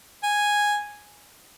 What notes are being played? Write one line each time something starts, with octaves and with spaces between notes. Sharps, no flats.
G#5